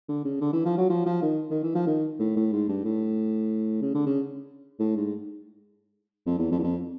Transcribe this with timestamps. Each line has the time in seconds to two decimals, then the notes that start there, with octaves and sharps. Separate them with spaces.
0.08 D3
0.25 C#3
0.41 D3
0.53 E3
0.65 F3
0.78 F#3
0.90 F3
1.06 F3
1.22 D#3
1.51 D#3
1.63 E3
1.75 F3
1.87 D#3
2.20 A2
2.36 A2
2.52 G#2
2.69 G2
2.85 A2
3.82 C#3
3.95 D3
4.06 C#3
4.80 A2
4.96 G#2
6.26 F2
6.38 E2
6.51 F2
6.58 E2
6.63 F2